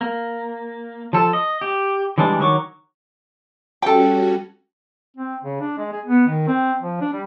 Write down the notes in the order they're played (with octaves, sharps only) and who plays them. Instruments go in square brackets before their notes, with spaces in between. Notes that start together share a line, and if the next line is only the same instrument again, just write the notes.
[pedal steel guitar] A#3
F3 A4
D#5
G4
E3 G3 G#3 D4
D#3 F#3 A#4 C#6 D6
[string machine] G3 C#4 F#4 [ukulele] A4 G5
[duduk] C4
C#3
D4
G#3
G#4
B3
D#3
C4
F3
D4
G3